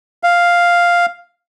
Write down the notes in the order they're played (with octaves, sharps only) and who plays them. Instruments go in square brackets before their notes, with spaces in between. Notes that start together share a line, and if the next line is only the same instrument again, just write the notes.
[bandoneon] F5